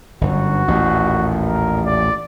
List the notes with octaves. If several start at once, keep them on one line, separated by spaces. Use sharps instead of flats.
G1 F#2 F#4
A1 D#2 A#2
A#4
D5